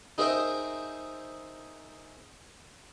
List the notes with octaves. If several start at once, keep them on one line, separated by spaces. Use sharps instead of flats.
D#4 G#4 A#4 C5 E5 G5